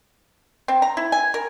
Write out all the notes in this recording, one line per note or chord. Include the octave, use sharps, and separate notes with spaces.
C4
A#5
E4
G#5
A#4